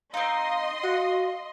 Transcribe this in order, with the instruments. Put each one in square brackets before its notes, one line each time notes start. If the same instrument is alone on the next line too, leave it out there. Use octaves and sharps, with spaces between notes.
[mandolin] C4 D#4 [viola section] D#5 C6 [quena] F5
[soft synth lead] F#4 [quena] F5 [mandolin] F#5